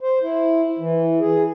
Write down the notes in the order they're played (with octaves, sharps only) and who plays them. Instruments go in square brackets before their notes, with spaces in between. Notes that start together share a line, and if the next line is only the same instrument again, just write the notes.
[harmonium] C5
E4
E3
G#4